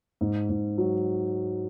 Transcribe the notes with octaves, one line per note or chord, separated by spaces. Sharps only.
G#2
G#2
F#3